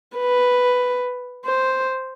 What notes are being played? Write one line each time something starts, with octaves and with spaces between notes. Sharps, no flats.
B4
C5